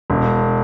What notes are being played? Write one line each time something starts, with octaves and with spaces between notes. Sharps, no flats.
E1